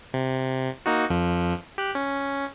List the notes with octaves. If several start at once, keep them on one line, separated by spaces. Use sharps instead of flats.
C3
A#3 D#4 F#4
F2 F3
G4 F#6
C#4